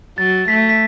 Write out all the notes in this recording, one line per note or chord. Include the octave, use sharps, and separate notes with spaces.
F#3 A6
A3 B6
B6